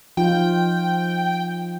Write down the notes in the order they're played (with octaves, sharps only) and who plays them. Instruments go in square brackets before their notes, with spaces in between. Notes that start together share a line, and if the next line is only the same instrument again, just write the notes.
[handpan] F3 D#4 F4 [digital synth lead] G5